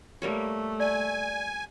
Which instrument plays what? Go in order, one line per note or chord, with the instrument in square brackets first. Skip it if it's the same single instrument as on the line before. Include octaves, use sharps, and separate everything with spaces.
[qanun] G3 A#3 C#5 [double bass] A3
[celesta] D5 [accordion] G#5